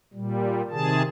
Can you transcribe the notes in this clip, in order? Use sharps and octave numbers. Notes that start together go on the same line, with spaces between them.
A#2 G3
C3 D#3 G#4 A5